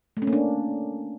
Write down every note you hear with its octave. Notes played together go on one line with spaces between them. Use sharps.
A3
C#4
A#3
D4